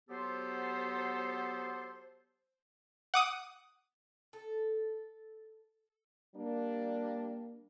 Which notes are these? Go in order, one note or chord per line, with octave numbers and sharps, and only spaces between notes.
F#3 B3 G4 A4 C5
F#5 D6 D#6
A4
G3 A#3 D4